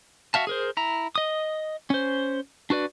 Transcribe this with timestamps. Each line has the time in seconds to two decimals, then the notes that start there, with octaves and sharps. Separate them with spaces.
0.34 F#4 E5 F5 A5
0.47 G#4 A#4 C5
0.77 E4 A#5
1.15 D#5 D#6
1.90 C#4 C5
2.70 D4 F#4 B4 D5